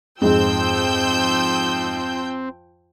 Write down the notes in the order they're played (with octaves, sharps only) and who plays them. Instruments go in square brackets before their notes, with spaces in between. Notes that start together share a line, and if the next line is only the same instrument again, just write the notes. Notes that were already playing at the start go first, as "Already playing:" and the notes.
[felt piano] F2 G#2 [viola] F3 G5 [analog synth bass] C4 [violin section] E6 G6